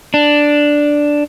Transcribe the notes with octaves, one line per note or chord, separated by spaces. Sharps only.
D4